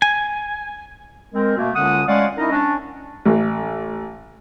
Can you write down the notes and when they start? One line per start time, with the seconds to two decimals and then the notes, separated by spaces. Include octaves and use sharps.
0.02 G#5
1.34 G#3 C4 A#4
1.57 B2 A3 A#3
1.75 C#2 D3 C#4 F#5 D#6
2.07 G#3 A3 C#4 D5 F5 F#5
2.38 C#4 D#4 E4 A#4 D#5
2.52 C#4 D4
3.25 A1